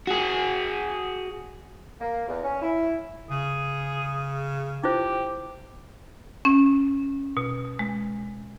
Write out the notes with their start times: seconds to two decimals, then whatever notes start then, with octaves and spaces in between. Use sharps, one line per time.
0.07 F#4 G#4
2.00 A#3
2.28 E2
2.44 C#4
2.62 E4
3.30 C#3 G#4
4.84 E4 F4 G4 C5
6.45 C#4
7.37 B2
7.79 G#3